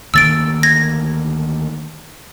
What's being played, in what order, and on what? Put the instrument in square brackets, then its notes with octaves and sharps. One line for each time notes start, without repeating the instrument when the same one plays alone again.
[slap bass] D2 D#3 A#3 [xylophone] E6 A6 D7
[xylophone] G#6 A#6